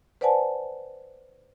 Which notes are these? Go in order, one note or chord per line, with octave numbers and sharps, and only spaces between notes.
B4 C5 D5 F#5 G#5 A5